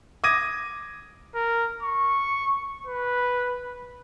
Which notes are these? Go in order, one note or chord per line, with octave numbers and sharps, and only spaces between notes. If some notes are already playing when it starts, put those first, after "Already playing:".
D6 D#6 G#6 A#6 D#7
A#4
C#6
B4